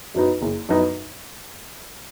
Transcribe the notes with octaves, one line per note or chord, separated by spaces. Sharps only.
F#2 F#3 B3 D#4
F#1
F#2 F#3 B3 D#4